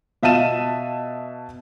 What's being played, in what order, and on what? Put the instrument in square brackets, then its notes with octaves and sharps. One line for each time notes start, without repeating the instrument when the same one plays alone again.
[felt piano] B2 E5 F5 A5 D#7 E7